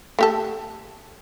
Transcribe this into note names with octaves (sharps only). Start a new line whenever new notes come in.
A3 G4 A4